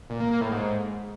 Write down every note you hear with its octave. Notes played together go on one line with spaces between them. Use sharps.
A#2
A#3
A#3
A2
G#2